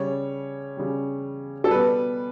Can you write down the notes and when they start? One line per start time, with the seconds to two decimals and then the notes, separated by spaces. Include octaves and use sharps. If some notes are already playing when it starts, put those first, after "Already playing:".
Already playing: C#3 G3 C#5
0.77 C#3 G3
1.64 A4
1.71 B2 G3 B4